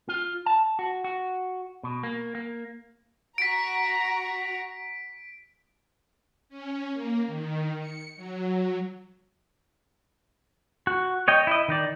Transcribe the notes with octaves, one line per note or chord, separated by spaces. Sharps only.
F4
A5
F#4
F#4
B2
A#3
A#3
F#4 A#5 B6 D7
C#4
A#3
D#3
C#7
F#3
F#4
C#5 D#5 G5
E4 D#5
D#3 D#4 D5